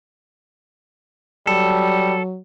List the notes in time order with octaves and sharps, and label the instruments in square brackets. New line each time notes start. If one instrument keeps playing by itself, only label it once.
[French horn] F#3 [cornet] G3 [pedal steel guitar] A4